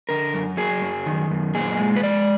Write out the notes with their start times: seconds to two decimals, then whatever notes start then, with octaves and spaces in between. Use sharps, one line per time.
0.09 D3 A#4
0.34 F#2
0.57 F#3 G#4
0.82 F#2
1.06 D#3
1.31 F#2
1.54 A#2 G#4
1.79 G#3
1.96 B4
2.03 G#3 D5